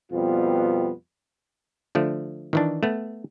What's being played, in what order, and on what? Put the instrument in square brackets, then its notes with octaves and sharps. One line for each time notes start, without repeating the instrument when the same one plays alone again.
[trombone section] F2 B2 G3 B3 F4
[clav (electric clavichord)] D3 F3 A3
D#3 E3 D4
A3 B3